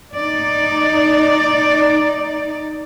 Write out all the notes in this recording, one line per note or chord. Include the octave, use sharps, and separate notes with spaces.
D#4 D5